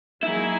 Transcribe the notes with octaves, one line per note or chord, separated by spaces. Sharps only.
F#3 A#3 D#4 E4 G#4